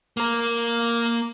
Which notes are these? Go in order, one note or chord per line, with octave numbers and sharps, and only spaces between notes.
A#3 A#4